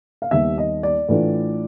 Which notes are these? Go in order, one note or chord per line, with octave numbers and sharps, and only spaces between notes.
F5
D#2 D#3 G3 B3 E5
D#5
D5
A2 E3 A3 D4 F4